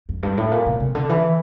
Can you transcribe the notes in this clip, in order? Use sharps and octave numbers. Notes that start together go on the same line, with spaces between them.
F2
G2
A2
A#2
C3
C3
D3
E3